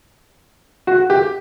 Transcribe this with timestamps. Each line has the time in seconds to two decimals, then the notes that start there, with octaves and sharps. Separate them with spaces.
0.87 F#4
1.10 G4